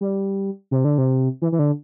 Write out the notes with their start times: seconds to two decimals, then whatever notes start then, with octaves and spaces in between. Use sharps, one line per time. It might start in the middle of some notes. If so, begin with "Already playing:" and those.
0.01 G3
0.71 C3
0.84 D3
0.98 C3
1.42 E3
1.52 E3
1.59 D3